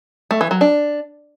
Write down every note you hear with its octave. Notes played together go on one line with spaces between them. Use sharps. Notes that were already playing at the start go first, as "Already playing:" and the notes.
A3
E3
F#3
D4